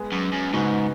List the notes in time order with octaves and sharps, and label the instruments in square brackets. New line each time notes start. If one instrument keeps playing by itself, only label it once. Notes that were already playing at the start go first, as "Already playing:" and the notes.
Already playing: [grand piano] G#3 B3 G#4
[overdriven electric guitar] F#2
F#2
[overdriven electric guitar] G#2 [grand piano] C#3 B3 D#4 F#4